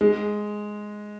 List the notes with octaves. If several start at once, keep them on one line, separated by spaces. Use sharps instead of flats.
G#3